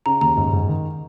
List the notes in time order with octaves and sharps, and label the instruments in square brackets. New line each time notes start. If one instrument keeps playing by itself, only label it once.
[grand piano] C#3 [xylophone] A#5
[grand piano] D#2 [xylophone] A#5
[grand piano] G#2
G#2
D#3